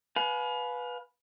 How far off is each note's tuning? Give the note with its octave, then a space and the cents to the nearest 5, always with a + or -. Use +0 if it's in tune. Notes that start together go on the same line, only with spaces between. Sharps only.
B4 +0 F5 +30 G#5 +30